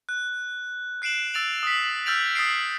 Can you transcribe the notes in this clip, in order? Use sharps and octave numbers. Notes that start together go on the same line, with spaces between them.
F#6
F#6 C7 D7 E7 F#7
E6 A6 D7 F7 F#7
D#6 B6
E6 F6 G6 A6 D7 F7
D#6 A6 B6 C7 D7